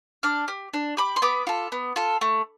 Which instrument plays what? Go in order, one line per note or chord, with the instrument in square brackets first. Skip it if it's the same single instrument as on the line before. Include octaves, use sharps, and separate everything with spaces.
[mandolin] D4 D6 F6
G4
D4
G4 B5 D6
C6
B3 B5 D6
F4 A4
B3
F4 A4
A3